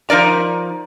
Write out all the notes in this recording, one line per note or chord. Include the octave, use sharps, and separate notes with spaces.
F3 D#4 A#4 D5 A#5